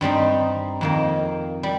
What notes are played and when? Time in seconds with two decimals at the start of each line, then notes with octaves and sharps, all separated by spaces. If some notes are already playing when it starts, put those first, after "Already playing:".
0.01 G2 G3 C4 D#4
0.81 F2 D#3 A#3
1.63 G3